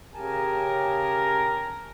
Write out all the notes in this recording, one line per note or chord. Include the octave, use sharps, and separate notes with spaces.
C#3 G4 A#4 G#5 A5